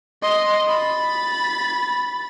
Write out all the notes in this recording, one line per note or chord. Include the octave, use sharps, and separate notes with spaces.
D#5 C6
B5 A6